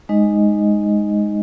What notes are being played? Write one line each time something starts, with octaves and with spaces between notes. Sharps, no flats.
G#3 D#4 D#5